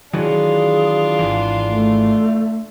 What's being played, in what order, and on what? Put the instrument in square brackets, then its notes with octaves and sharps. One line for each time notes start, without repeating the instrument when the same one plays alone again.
[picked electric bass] D#3 E3 F#3 [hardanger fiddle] D4 F4 [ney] G#4
[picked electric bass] G#1 E3
[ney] A3